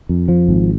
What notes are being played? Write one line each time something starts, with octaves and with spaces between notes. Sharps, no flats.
F2
F3
G#1